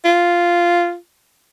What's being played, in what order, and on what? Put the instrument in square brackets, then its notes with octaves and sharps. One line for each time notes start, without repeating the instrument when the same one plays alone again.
[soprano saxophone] F4